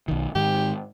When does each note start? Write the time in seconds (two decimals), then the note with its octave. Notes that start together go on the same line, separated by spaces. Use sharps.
0.08 B1 D#3
0.35 G#2 D#3 G4